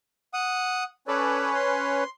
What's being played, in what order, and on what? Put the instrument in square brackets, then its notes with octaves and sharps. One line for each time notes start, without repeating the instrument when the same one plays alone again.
[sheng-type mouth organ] F#5 D#6
[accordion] C#4 B4 C#5 [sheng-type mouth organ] A4 D5
[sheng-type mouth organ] C6